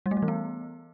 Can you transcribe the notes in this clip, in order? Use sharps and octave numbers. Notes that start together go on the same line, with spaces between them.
G3
A3
G3
E3
B3